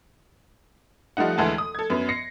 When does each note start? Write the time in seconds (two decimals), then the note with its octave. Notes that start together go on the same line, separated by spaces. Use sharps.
1.17 F3 G3 A3 D#4 F#5
1.38 D2 E3 G#3 A5
1.58 D#6
1.75 A4 G#6
1.90 F#2 B3
2.09 A#6 C7 C#7